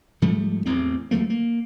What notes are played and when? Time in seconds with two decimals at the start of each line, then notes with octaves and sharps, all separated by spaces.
0.22 G#2 F3 G3 A3
0.66 A1 E2 A2 C4
1.11 D#2 F#3 A3 A#3
1.30 A#3